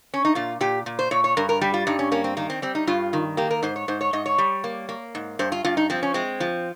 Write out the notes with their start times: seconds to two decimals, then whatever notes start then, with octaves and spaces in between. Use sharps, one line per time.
0.14 C#4
0.25 D#4
0.35 A#2 F4
0.61 A#2 G4
0.86 A#2
0.99 C5
1.11 A#2 C#5
1.24 C#5
1.37 G2 A#4
1.49 A#4
1.61 G3 G4
1.74 F4
1.87 G2 D#4
1.99 C#4
2.12 A#3 C#4
2.24 C4
2.37 D#3 A#3
2.50 C4
2.62 G3 C4
2.75 D#4
2.87 G2 F4
3.13 D#3
3.37 A#3 G4
3.51 A#4
3.63 G#2 C5
3.76 C#5
3.88 G#2 C5
4.01 C#5
4.13 G#2 D#5
4.26 C#5
4.38 G3
4.64 A#3
4.89 A#3
5.15 G#2
5.39 G2 C5
5.52 F4
5.64 G2 F4
5.77 D#4
5.90 F3 C4
6.03 C#4
6.14 G#3 C4
6.40 F3